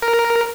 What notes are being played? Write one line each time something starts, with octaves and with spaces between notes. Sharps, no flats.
A#4